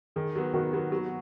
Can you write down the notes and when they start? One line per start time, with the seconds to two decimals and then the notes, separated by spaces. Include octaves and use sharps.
0.16 D#3 G#4
0.36 F#3 B3
0.54 D#3 F#4
0.73 F#3 B3
0.92 F#3